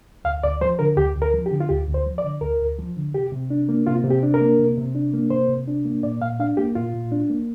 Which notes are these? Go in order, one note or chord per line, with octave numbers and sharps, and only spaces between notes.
D2 F5
D2 D5
F3 C5
D3 A#4
D2 G4
D2
A#4
F3
G4
D3
F4
D2 G4
D2
C5
F3
D5
D3
D2 A#4
D2
F3
D3
C3 G4
C3
D4
A#3
C3 F4
C3
G4
D4
A#4
A#3
C3
C3
D4
A#3
C3 C5
C3
D4
A#3
A#2 D5
A#2 F5
D4 F5
A#3 G4
A#2 F4
A#2
D4
A#3